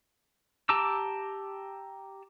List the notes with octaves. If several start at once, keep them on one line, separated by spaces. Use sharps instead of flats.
G4 A5 A#5 D6 E6